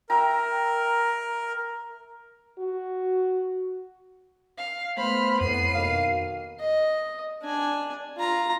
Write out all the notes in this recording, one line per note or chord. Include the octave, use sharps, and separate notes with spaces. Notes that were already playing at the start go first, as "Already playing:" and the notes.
A#4 E5 G5 A#5
F#4
F5
A3 B3 C5 B5 F6
F2 A2 B3 C7 D#7
B2 D#3 A#3 F5
D#5
D4 G#5
F4 A#5